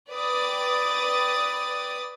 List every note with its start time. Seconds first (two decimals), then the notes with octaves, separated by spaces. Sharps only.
0.11 B4 D5 G5 D#6 A6